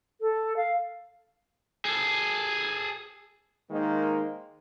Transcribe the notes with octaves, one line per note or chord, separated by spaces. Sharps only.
A4
F5
G#4 A4
D#3 G#3 A#3 D#4 C5